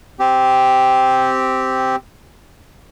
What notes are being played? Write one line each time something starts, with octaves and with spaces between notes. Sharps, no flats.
C4 G4